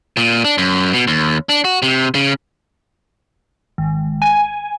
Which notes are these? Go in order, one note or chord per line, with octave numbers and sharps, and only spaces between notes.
A#2
D4
F#2
B2
D#2
D4
F#4
C3
C#3
G#1
G#5